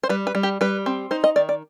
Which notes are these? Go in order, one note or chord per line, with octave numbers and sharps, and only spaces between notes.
C5
G3 B4
B4
G3
G4
G3 B4
C4
D#4 C5
D#5
D#3 D5
D5